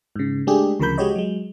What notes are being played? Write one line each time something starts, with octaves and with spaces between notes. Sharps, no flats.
G#2 C#3
G#3 A3 D4 G4 G#4
D2 C#3 F3 A#4 B5 G6
G#3 F#4 G4 C#5 D#5
F#3 G#3